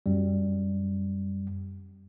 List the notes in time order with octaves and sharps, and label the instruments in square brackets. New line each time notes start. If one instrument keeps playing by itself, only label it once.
[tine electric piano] F#2 G3